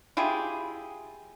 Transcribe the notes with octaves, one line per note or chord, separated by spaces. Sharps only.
E4 F4 G4 G#4